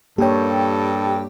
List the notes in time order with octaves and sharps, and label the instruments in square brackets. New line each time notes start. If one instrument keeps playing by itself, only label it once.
[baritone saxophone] G2 [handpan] A#3 C#5 [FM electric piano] G4 G5 [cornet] A4